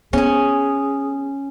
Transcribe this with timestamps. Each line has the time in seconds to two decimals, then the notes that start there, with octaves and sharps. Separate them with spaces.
0.13 B3 C#4 G#4 G#5